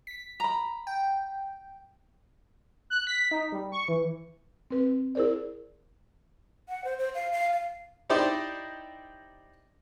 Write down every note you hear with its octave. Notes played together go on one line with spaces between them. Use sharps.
B6
A#5 B5
G5
F#6
B6
D#4
G3
C#6
E3
C4 B4
E4 G#4 A#4 C5 D5
F#5
C5
C5
F5
F5
F5
D#4 E4 G4 C5 D5 D#5